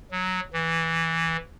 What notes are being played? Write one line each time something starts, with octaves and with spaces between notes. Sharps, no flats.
F#3
E3